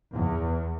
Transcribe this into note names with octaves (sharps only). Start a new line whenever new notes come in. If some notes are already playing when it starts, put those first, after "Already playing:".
E2